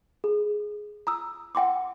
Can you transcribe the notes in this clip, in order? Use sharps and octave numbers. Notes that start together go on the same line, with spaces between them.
G#4
A#5 D#6 E6
F#5 G5 C6 D6